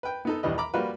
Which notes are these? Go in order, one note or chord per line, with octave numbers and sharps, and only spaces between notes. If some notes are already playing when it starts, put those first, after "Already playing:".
B4 G5
B3 D#4 A4
A#1 D#2 E3 G3 B4 D#5
A#5 B5 D6
G3 A#3 F4 F#4 B4